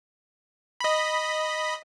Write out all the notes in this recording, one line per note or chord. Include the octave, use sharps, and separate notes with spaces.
D#5 B5